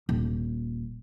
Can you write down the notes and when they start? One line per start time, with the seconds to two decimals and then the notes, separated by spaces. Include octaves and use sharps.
0.09 D#1